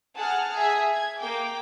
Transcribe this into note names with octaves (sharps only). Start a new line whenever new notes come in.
G#4 F#5 A5 F6
G#4 E5
G#6
A#3 G5 D6